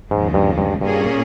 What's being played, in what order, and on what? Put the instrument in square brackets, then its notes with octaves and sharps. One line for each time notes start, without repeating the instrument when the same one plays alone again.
[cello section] D#2 C#3 F3 G#3 [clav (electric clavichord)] G#2
[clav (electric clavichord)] G2
G2
[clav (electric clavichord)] G2 [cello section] A#2 G3 A#3 C#4 G#4